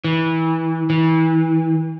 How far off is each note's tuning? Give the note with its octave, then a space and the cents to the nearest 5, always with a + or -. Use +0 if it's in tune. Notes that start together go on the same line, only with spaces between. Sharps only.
E3 -20
E3 -30